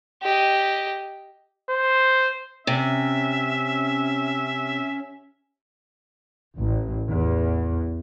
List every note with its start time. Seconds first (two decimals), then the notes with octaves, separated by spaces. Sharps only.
0.22 G4 D#5
1.70 C5
2.67 C3 C#4 E5
6.58 A1
7.10 E2